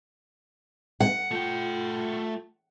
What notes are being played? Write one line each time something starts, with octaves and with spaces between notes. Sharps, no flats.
F#5
A3 F4 G5